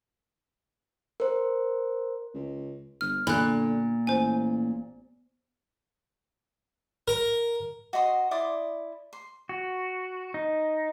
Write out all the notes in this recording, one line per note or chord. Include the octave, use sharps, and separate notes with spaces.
A#4 C5
C#2
G1 F6
A#2 D3 B5 F#6
A1 C5 G#5
A#4
F#4 D#5 C6 D#6
E4 D5 C6 D#6
C6
F#4
D#4